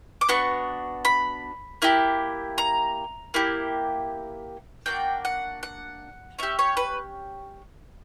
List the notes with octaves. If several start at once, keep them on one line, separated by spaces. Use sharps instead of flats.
D6
B3 D4 F#4 C#6
B5
A#3 E4 G4
A#5
A#3 E4 G4
A#3 D4 F#4 G5
F#5
F#5
C#4 G4 E5
C#5
B4